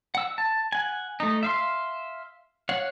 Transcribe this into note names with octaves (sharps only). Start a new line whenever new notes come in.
F#5 E6
A5
F#5 G#5
A3 D#4
E5 F5 C6
C#5 F5 F#5